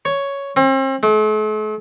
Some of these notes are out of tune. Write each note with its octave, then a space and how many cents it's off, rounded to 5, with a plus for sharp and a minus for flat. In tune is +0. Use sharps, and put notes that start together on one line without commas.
C#5 +5
C4 +40
A3 -45